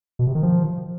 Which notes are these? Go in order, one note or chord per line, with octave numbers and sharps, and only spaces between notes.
B2
C3
D#3
F3